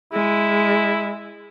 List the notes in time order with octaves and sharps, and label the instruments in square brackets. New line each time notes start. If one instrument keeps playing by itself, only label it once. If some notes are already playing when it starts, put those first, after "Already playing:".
[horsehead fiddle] G#3 [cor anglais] E4